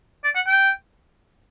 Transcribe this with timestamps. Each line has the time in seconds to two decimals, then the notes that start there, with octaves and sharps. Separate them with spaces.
0.24 D5
0.35 F#5
0.46 G5